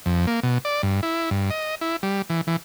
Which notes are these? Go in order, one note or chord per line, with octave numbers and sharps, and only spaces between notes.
F2
A#3
B2
D5
G2
E4
G2
D#5
E4
G3
E3
E3